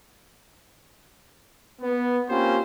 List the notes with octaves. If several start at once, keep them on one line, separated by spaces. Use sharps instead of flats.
B3
A#3 C4 C#4 F4 G4 C5